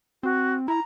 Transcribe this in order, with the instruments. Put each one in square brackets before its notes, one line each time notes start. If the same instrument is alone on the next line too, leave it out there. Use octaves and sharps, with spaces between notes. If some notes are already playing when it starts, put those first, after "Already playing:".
[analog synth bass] C4 [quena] F#4
[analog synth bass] E4 [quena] A#5